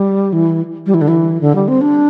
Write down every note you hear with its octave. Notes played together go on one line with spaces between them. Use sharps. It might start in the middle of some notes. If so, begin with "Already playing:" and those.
Already playing: G3
E3
G3
E3
D3
E3
D3
G3
C4
D4